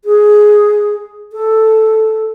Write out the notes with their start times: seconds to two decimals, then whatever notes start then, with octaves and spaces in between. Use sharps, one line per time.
0.05 G#4
1.33 A4